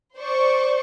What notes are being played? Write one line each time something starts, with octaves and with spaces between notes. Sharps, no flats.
C5 D5 C#6